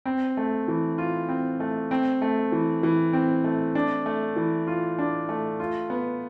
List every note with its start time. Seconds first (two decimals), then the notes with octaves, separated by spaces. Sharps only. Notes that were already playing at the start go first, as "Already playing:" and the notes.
0.05 C4
0.37 A3
0.68 E3
0.98 F4
1.29 C4
1.60 A3
1.91 C4
2.22 A3
2.52 E3
2.83 E3
3.13 C4
3.44 A3
3.75 D4
4.06 A3
4.36 E3
4.67 F4
4.99 D4
5.29 A3
5.60 F4
5.90 B3